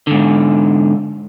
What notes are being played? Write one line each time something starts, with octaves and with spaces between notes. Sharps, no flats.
G#2 D3